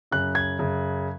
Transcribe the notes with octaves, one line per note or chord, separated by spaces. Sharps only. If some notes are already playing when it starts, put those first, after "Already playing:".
F#2 C#3 F#6
G#6
F#2 C#3